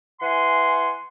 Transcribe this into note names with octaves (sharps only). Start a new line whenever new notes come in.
E3 F#5 G#5 C6